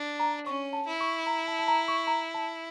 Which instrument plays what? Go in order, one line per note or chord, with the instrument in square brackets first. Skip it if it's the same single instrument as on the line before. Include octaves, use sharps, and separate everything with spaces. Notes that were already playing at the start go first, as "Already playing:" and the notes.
Already playing: [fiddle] D4
[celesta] A#5
[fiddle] C#4 [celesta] C#6
[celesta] A5
[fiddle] E4
[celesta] C#6
A#5
A5
A5
A#5
C#6
A#5
A5